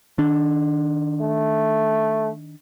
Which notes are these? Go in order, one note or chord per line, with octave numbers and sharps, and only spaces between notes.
D#3 D4
A3